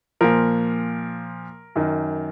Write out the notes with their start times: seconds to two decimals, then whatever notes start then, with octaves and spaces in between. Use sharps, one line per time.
0.21 A#2 F3 A#4
1.76 F#2 D#3